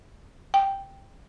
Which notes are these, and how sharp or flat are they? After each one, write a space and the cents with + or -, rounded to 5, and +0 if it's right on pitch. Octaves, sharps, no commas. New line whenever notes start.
G5 +0